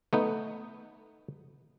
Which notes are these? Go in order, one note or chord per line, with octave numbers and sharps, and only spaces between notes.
A3 B3 D#4